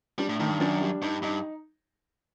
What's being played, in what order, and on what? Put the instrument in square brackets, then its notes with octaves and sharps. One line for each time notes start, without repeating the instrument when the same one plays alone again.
[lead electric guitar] G3 [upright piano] D4
[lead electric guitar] A2
[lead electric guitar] A2 [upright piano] D#3
[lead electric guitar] G2
[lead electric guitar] F#2 [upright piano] D4
[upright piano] G3
[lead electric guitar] G2 [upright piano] D#4
[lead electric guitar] G2 [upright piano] D#4